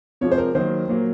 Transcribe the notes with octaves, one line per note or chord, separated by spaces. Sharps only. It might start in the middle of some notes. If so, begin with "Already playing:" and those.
C3 F3 G#3 C#5
C5
A#4
D#3 F#3 A#3 C5
A#2 F#3 A#3